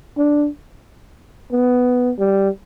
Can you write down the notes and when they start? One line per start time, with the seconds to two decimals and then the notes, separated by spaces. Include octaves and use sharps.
0.17 D4
1.52 B3
2.19 G3